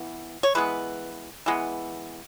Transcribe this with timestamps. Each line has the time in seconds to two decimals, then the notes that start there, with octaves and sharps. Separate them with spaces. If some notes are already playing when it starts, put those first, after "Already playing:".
Already playing: E3 B3
0.43 C#5
0.55 E3 G#3 B3 B4
1.46 E3 G#3 B3